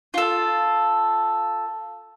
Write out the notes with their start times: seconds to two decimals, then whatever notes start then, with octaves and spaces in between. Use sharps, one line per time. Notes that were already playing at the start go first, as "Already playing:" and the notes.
0.14 F4 A4